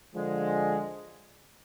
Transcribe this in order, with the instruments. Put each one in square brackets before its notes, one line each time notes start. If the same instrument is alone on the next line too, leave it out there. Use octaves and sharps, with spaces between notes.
[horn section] D3 F3 G#3